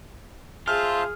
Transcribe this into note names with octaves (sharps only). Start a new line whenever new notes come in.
F4 G#4 C5 E5 A5 F6